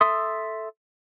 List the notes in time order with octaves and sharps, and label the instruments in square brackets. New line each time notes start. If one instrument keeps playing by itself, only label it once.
[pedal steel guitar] A4 E5 C6 D#6